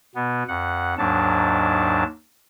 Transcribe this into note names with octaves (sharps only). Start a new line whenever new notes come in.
B2 B3
F2 F#5
D#2 G#2 F#3 D4 A5